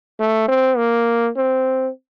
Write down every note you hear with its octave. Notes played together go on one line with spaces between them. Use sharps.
A3
C4
A#3
C4